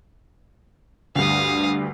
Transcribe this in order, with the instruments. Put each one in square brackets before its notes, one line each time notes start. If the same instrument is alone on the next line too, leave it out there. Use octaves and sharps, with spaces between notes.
[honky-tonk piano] D2 G2 [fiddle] F5 D#6